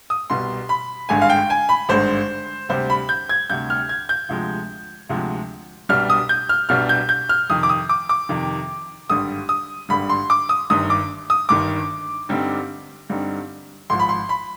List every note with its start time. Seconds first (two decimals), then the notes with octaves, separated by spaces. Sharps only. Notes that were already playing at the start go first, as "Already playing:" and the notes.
0.10 D#6
0.30 C2 B2 G3 C6
0.69 B5
1.09 G#1 G2 D3 G#3 G#5
1.22 F5
1.30 G5
1.50 G#5
1.69 B5
1.89 G#1 G2 D3 G#3 C5
2.69 D2 C3 G3 C5
2.90 B5
3.09 G6
3.29 G#6
3.50 D2 C3 G3 G6
3.70 F6
3.89 G#6
4.09 G6
4.29 D2 C3 F3 G#3
5.09 D2 C3 F3 G#3
5.89 C2 B2 G3 D4 F6
6.10 D#6
6.29 G6
6.49 F6
6.69 C2 B2 G3 D4 F6
6.89 G6
7.09 G6
7.29 F6
7.50 F2 C3 D#3 D#6
7.63 D6
7.69 D#6
7.89 D6
8.09 D6
8.29 F2 C3 D#3
9.10 G#1 G2 D3 G3 D#6
9.49 D#6
9.89 G#1 G2 D3 G3 B5
10.09 C6
10.30 D6
10.49 D#6
10.70 G1 G2 D#3 D#6
10.90 D6
11.30 D#6
11.49 G1 G2 D#3 D6
12.29 G2 D3 G3 C4 D#4
13.10 G2 D3 G3 C4 D#4
13.90 G#1 G#2 F3 C6
14.00 B5
14.09 C6
14.29 B5